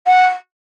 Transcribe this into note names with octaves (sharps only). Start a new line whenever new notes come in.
F#5